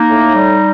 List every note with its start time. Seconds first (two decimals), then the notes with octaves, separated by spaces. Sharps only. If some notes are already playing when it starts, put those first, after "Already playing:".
Already playing: A#3 D#4
0.10 A2
0.35 G3